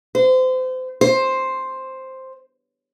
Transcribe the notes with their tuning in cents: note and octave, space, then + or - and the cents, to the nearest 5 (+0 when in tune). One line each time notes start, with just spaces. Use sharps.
C5 -30
C5 +5